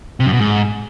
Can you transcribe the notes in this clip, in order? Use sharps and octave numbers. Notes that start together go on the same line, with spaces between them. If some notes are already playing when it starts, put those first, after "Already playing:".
C3
F#2
B2
G#2